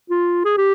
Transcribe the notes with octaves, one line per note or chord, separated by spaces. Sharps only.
F4
G#4
G4